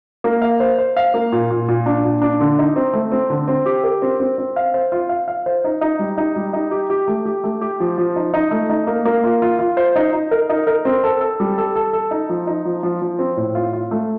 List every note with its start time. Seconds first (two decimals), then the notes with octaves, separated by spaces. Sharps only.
0.24 A#3
0.42 F5
0.60 C5
0.78 C5
0.97 F5
1.14 A#3
1.32 A#2
1.51 A#2
1.68 A#2
1.86 D4
2.04 A#2
2.22 D4
2.40 D3
2.59 D#4
2.76 C4
2.93 A3
3.12 C4
3.30 D3
3.48 C4
3.66 G4
3.84 A#4
4.02 C4
4.20 C4
4.38 C4
4.56 F5
4.74 C5
4.92 F4
5.09 F5
5.28 F5
5.46 C5
5.64 D#4
5.81 D#4
5.99 G3
6.18 D#4
6.36 G3
6.53 D#4
6.71 G4
6.90 G4
7.08 A3
7.26 G4
7.44 A3
7.61 G4
7.80 F3
7.98 F3
8.16 D#4
8.34 D#4
8.51 A3
8.70 D#4
8.87 A#3
9.05 A#3
9.24 F4
9.42 F4
9.59 F4
9.77 C5
9.96 D#4
10.13 D#4
10.31 A#4
10.49 D#4
10.67 A#4
10.85 C4
11.04 A4
11.21 A4
11.40 G3
11.58 A4
11.76 A4
11.93 A4
12.11 D#4
12.29 F3
12.47 D#4
12.65 F3
12.83 F3
13.02 F3
13.19 C4
13.37 A2
13.55 F4
13.73 F4
13.91 A3